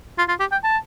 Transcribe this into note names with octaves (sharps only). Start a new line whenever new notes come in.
F4
F4
G4
G5
A5